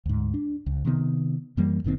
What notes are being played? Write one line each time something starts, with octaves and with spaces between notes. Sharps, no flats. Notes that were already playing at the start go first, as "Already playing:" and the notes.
D2 G#2
D4
C#2
C3 D#3 B3
F#2 E3 G3 A#3
F#1 A#2 D#3 C4